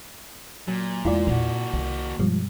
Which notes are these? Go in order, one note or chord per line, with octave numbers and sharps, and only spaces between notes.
A#2 F#3
E2 G#3 A3 E4 F4 D5
A#2 A#3 C4 F#4
C2 D#3
G2 B2 F3 G3 G#3